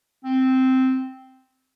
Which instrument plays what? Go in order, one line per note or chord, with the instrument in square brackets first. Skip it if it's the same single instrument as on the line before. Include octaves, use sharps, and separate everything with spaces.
[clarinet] C4